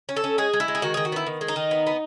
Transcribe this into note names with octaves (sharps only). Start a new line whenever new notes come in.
C#4
A4
C#4
G#3 G#4
G#3
E4
G#3
G#4
D#3 F#4
D#3 G#4
F#4
B3 E4
D#3
G#3
D#4
D#3
B3
B3